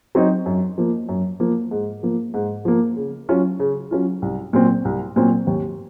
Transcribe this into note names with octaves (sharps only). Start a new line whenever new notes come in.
F#3 C4 D#4
F#2
F3 A#3
F#2
F3 A#3
G#2
F3 A#3
G#2
F3 A#3
C#3
F#3 C#4 F4
C#3
F#3 C#4 F4
C2
A#2 F#3 C4
C2
A#2 F#3 C4
D#2